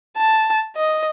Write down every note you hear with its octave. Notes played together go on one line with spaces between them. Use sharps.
A5
D#5